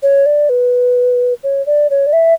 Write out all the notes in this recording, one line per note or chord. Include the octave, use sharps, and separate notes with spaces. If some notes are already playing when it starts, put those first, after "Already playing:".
C#5
D5
B4
C#5
D5
C#5
D5
E5